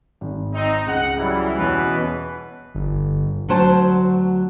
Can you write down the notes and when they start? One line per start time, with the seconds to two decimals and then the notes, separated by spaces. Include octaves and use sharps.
0.21 G#1
0.54 C4 D#4
0.87 C#2 F#5
1.18 E3 F#3 G3 E4
1.59 E2 B2 B3 C#4 B4 B5
2.75 G1
3.48 D2 F#3 C5 A5